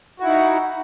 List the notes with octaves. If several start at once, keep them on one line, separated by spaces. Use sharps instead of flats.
D#4 E4 F#4 F#5